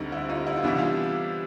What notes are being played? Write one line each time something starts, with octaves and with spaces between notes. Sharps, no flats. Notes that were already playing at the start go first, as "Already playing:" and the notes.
Already playing: D2 D3 G3 C4 D#4
E4
D#4 F4
E4
F4
C3 E3 G3 B3 D4 E4
F4